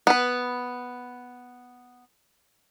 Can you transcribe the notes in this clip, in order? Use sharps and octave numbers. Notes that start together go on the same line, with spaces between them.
B3 B4